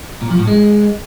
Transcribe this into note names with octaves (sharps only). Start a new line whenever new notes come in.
A#2
F3
A2
G#3